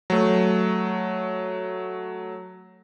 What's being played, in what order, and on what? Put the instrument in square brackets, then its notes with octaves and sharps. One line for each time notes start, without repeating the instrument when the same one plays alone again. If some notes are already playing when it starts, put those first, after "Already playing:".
[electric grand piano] F#3 A3